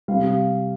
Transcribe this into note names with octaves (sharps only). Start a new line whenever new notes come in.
C3 G3 F5